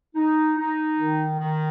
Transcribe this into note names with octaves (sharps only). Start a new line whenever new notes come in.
D#4
D#4
D#3
D#3